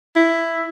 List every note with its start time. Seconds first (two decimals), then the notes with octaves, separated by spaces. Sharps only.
0.16 E4